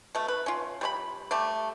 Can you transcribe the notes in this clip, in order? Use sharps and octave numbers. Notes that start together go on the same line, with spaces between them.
B2 A3
B4
C#4 F4
G3 C#5 B5
G3 A3 D5